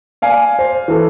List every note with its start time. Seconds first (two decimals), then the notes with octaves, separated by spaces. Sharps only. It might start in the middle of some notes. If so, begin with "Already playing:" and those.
0.22 D5 F5 G#5
0.59 C5
0.88 E3 A4